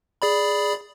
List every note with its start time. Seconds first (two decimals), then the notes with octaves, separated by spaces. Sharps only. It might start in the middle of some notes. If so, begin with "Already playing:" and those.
0.22 G#4 D5 B5